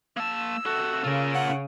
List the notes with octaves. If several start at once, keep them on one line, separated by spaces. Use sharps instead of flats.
A#3 A5 E6
C3 F#4 A4
C#3 F4 A#4
F#5